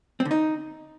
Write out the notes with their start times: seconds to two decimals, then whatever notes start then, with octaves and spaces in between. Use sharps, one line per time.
0.20 C4
0.25 D3
0.31 D#4